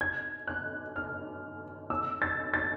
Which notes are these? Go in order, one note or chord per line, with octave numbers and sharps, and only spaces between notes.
G#6
F#6
F6
E6
A6
A6